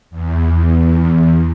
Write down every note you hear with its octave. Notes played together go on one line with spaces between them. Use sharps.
E2